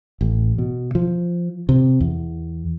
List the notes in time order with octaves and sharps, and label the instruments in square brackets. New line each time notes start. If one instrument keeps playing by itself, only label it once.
[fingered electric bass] A1
B2
F3
C3
E2